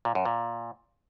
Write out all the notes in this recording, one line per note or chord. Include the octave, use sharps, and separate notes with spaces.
A#2
F#2
A#2